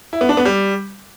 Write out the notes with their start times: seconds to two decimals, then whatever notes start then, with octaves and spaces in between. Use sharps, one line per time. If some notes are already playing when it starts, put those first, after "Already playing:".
0.13 E4
0.21 B3
0.29 D4
0.37 B3
0.45 G3